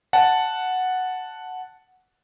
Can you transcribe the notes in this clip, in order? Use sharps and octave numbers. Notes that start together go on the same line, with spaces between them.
F#5 A5